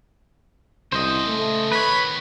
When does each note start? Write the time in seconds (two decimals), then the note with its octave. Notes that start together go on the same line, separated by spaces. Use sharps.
0.92 C2 C#3 A4 C5 D#5
1.28 A3
1.72 D#3 B3 B4 C#5 B5